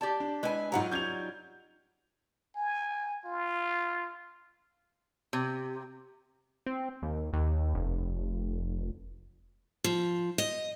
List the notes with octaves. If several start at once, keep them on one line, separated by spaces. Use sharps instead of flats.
G4 D5 A5
D4
G#3 E4 B4 G#5
G#2 F#3 D#4 F4 F#5 A#5
G3 C#4 G6 G#6 F7
G#5
F4
C3
C4
D#2
D#2
F1
F3
D#5